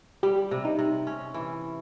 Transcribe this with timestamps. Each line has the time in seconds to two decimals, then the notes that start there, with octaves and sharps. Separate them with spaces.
0.23 G3 G4
0.51 C3
0.65 D#4
0.79 C3
1.07 C#4
1.34 E3